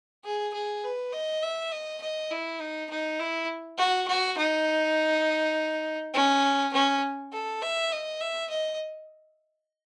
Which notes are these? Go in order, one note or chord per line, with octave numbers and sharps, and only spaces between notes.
G#4
G#4
B4
D#5
E5
D#5
D#5
E4
D#4
D#4
E4
F#4
F#4
D#4
C#4
C#4
A4
E5
D#5
E5
D#5